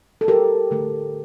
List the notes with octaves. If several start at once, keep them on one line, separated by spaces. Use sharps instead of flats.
A4
G4 A#4
D3 A3